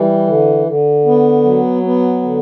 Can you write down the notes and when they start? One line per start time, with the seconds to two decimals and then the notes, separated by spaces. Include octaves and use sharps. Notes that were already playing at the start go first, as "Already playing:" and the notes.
Already playing: E3 G3
0.27 D3
0.66 D3
1.05 B3
1.44 F#3
1.83 B3
2.22 D3